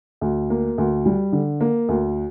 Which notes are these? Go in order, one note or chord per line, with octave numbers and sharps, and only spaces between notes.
D2
A#3
D2
G3
D3
A#3
D2